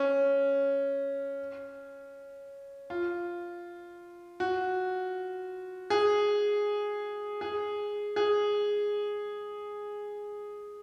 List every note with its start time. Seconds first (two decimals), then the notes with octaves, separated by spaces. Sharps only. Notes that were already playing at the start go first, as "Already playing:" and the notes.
Already playing: C#4
2.90 F4
4.40 F#4
5.90 G#4
7.41 G#4
8.16 G#4